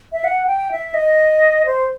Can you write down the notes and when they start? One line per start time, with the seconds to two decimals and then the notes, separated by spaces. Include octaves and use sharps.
0.12 E5
0.24 F#5
0.47 G5
0.72 E5
0.94 D#5
1.66 C5